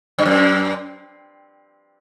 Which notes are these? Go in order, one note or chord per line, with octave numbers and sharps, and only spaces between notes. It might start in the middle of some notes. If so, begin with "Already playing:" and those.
G2
F#2